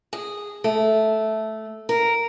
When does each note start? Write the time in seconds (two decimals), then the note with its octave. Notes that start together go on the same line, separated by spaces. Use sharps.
0.13 G#4
0.64 A3
1.89 A#4